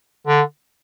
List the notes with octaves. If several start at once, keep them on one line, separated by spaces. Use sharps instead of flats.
D3